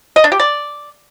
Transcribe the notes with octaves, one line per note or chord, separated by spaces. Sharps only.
D#5
D4
G4
D5